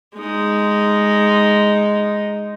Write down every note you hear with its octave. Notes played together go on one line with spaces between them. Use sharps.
G#3 D#4